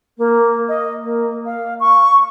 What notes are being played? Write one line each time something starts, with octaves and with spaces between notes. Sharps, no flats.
A#3
D#5
A#3
F5
C#6